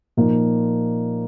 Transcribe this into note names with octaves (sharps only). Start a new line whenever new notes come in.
A#2 F3 A#3 D#4